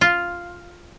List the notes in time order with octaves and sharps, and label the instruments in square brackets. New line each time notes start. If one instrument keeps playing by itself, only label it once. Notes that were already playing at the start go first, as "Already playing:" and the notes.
[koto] F4